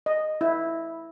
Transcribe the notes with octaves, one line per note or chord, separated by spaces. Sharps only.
D#5
E4